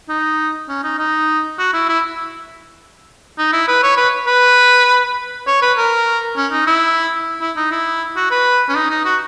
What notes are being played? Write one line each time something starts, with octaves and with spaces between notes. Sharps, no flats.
D#4
C#4
D#4
D#4
F#4
E4
E4
D#4
E4
B4
C#5
B4
B4
C#5
B4
A#4
C#4
D#4
E4
E4
D#4
E4
F#4
B4
C#4
D#4
D#4
F#4